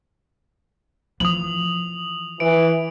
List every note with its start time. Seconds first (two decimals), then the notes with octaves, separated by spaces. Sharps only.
1.20 E3 F3 D#6 F#7
2.40 E3 D7